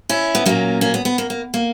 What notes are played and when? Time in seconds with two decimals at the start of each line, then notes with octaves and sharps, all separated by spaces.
0.09 C#4 E4
0.35 B3
0.46 A#2 F#3 A#3 C#4
0.81 A#3 C#4
0.94 B3
1.05 B3
1.18 A#3
1.30 A#3
1.54 A#3